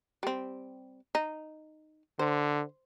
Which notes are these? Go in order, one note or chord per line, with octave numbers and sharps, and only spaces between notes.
G3 C4
D#4
D3 C5